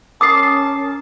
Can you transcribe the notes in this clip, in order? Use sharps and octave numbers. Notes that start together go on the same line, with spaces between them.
C#4 A#4 A5 D6 D#6 C7